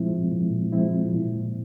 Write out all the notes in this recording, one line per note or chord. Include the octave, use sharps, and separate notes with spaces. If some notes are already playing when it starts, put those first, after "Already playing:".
Already playing: A#2 F3 G#3 C4 E4
A#2
F3 G#3 C4 E4
A#2